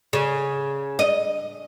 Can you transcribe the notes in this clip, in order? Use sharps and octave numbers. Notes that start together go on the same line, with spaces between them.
C#3
D#5